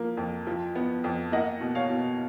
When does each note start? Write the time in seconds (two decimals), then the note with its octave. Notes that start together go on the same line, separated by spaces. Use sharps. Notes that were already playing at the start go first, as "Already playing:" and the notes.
Already playing: F3 A#3
0.17 F2
0.47 F3
0.75 B3
1.04 F2
1.32 A#3 D#5 F#5
1.61 B2
1.75 C#5 F5
1.90 B2